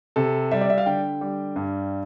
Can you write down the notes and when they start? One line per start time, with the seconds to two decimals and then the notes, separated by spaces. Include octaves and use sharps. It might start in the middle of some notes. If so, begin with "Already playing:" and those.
0.16 C3 A4
0.51 G3 E5
0.61 D5
0.70 E5
0.78 F5
0.86 D3 G5
1.21 G3
1.56 G2